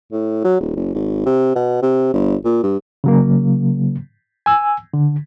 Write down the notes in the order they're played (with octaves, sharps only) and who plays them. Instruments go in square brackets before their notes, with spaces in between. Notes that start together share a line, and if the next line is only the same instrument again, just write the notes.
[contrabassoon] A2
F#3
D#1
F#1
G#1
C3
B2
C3
G1
A#2
G2
[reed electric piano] C#3 F#3 A#3
G#5 E6
D3